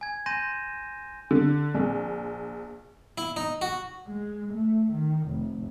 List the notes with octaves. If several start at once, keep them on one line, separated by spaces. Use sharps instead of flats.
G#5 G#6
G#5 C6 G6 A#6 D#7 E7
D3
A#1
E4
D#4
F#4
G#3
A3
D#3
F1